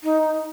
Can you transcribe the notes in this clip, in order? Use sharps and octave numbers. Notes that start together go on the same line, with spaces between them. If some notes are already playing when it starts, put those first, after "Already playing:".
D#4